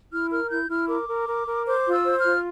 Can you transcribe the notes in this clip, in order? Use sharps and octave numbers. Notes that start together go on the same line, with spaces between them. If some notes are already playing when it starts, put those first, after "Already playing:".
E4 F6
A#4 F6
E4 G6
E4 F6
A#4 D6
A#4
A#4
A#4
C5 D6
F4
E6
C5
F6
F4